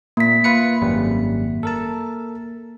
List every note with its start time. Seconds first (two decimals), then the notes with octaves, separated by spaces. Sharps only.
0.17 A#2 A#3 B6
0.44 F4 B4 C#7
0.82 G#1 F#2 G3
1.63 A4 A#4 A5